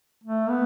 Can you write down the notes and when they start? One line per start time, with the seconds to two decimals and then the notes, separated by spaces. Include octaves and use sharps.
0.24 A3
0.50 B3